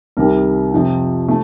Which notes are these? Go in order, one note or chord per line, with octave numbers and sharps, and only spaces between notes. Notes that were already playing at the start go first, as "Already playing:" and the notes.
C2 C3 D#3 G3 A#4
F2 C3 F3
A3